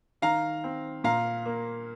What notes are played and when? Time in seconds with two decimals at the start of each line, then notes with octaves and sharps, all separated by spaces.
0.22 D#3 F5 A#5
0.64 C4
1.04 A#2 F5 A#5
1.46 A#3